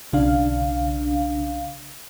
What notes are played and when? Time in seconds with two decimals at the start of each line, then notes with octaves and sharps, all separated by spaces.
0.13 B1 C#3 D4 F5